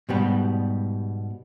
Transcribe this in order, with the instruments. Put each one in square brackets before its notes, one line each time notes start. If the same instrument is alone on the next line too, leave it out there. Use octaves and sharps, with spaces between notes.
[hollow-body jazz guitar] G#2 B2 G3